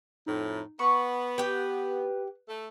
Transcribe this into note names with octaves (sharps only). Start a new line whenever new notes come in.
F2 A2 D#4
B3 B5 C#6
G4 B4 G5
A3